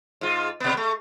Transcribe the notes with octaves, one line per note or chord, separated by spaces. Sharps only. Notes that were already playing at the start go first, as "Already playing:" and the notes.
G#2 F4
B2 B3
A3